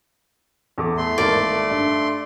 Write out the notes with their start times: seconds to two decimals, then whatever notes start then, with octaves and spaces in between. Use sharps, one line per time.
0.78 E2 A4 D6
0.97 A3 C6
1.18 G#1 A#3 D5 A5
1.70 G2